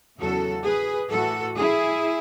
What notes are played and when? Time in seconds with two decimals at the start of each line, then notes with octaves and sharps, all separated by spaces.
0.19 E2 C#3 F#3 F#4 A4
0.65 G#4 B4
1.11 A2 E3 F#4 A4
1.58 E4 G#4